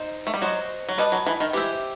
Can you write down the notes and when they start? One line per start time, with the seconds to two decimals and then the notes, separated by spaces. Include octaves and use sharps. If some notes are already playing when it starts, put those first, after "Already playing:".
Already playing: D#4 C5
0.27 A3
0.34 G3
0.41 F#3 F#4 C5 D#5
0.89 F#3
0.98 G3 B4 D#5 A5
1.12 F#3
1.26 E3
1.40 D#3
1.53 E3 G4 C5 E5